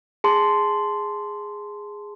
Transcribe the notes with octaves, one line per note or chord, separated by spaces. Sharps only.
G#4 A5 C6